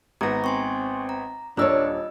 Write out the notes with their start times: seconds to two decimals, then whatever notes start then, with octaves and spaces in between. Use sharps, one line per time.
0.21 G#1 B3 A#5 A#6
0.44 C4 G#5 C6 C#6
1.09 A#5
1.57 D#1 D4 F4 A#4 C#5 D#5 E6